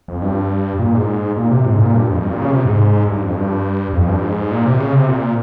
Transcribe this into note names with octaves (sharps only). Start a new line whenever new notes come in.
F2
G2
A#2
G#2
A#2
C3
G#2
A#2
G2
F2
G2
A#2
C#3
C3
G#2
G2
F2
G2
F2
G2
G#2
A#2
C3
C#3
C3
A#2